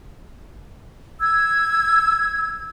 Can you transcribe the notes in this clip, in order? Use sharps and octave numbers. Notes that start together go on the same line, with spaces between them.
E6 G#6